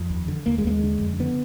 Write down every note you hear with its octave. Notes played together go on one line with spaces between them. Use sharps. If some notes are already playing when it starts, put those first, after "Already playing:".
Already playing: F2
D#2
D3
D#2 A#3
G#3
D#2 A#3
G#3
D3
F2
D3 B3